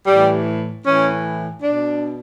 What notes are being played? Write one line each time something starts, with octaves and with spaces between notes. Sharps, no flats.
A2 E3 G3
A2 E3 C#4
B2 D4